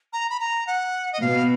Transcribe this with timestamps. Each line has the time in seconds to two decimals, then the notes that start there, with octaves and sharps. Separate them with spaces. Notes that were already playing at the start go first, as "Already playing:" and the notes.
0.13 A#5
0.30 B5
0.40 A#5
0.67 F#5
1.13 D#5
1.21 B2 F5